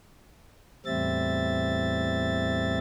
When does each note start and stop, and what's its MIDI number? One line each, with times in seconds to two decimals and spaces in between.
0.86 2.79 40
0.86 2.79 45
0.86 2.79 55
0.86 2.79 60
0.86 2.79 76
0.86 2.79 93